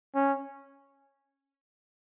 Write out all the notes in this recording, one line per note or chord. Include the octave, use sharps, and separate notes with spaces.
C#4